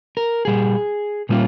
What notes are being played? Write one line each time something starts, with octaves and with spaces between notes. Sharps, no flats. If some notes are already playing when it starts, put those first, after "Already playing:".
A#4
A#2 G3 G#4
A#2 G3 A#3 C#4 F4